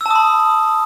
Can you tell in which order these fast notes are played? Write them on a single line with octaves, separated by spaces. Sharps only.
E6 A5 D#6 B5